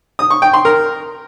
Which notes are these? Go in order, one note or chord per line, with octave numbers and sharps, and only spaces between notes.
D#6
C#6
G5
C6
A#4